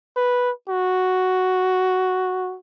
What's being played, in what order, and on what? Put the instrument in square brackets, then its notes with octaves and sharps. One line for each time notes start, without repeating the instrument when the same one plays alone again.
[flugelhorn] B4
F#4